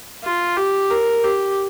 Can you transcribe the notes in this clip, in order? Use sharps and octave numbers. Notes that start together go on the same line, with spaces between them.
F4
G4
A#4
G4